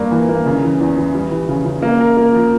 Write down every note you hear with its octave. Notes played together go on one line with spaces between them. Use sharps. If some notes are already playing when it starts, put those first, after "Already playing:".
Already playing: G2 A#3
E3
A#3
C#3
E3
E2
E3
G3
E3
C#3
C#3
A#3
A#4
A#3
F3